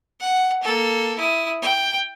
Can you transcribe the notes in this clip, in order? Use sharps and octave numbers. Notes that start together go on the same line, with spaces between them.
F#5
A#3 A4
E4 D#6
G5